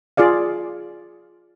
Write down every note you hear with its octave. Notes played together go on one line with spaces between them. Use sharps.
F4 G#4 D5 F5